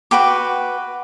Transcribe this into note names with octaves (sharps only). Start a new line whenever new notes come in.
F#4 B4 G5 D6